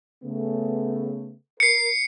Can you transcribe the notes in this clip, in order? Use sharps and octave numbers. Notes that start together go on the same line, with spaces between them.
C#3 A3 B3
A#4 C7 C#7